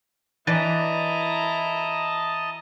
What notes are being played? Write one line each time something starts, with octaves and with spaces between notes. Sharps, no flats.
E3 E4 B4 D5 D#5 A5 A#5